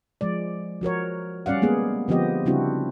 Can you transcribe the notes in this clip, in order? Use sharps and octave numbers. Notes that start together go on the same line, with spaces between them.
F3 G#3 D5
F3 F#4 A#4 C#5
G3 C#4 D5 F5 F#5
G#3 A#3 B3 G#4
D3 F3 B3 C4 G4 D#5
C#3 G3 C4 D4 E4 F#4